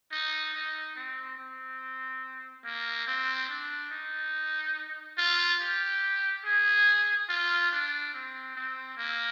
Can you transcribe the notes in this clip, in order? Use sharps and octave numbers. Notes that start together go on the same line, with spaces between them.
D#4
D#4
C4
C4
A#3
C4
D4
D#4
F4
G4
G#4
F4
D4
C4
C4
A#3